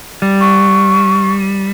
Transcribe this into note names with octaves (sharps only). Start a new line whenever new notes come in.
G3
C#6